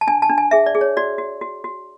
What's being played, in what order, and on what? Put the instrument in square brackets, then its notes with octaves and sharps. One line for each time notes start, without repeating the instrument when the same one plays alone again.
[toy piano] A5
D4 G#5
A5
D4
G#5
G#4 E5
D5
G#4
C#5
F#4 D5
F#4
F#4
F#4